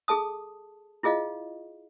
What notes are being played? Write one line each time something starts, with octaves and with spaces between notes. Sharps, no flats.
G#4 A4 A5 D#6
E4 F4 G#4 D#5 F5